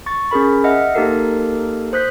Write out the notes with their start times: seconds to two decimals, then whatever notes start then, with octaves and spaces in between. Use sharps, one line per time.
0.06 C#6 A6
0.31 C#4 G#4 A#4 B5
0.64 D#5 E5 F#5 F6
0.95 A#3 D#4 G4 A4 A#4 C7
1.93 C5 D#6 F#6 G6 B6